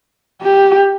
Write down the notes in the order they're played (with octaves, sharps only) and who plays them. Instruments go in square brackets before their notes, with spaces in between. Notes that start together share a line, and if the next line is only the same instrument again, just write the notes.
[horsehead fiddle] G4